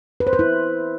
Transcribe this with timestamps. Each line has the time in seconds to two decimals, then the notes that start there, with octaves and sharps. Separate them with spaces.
0.20 B4
0.27 C5
0.33 B4
0.39 E4